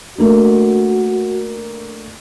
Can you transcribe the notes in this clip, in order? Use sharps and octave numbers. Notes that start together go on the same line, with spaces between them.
A3 A#3 D4 F#4